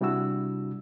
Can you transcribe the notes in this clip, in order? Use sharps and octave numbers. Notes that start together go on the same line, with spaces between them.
C3 G3 D4 E4 F#4 E6